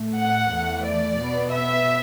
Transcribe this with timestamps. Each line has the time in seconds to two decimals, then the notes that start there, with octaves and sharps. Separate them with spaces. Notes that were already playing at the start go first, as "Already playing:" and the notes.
Already playing: A2 A3
0.18 F#5
0.52 E2 E3 A3
0.85 D5
1.20 B2 B3
1.53 E5